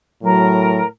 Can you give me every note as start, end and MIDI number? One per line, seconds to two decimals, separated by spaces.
0.23 0.85 45
0.23 0.81 54
0.23 0.84 70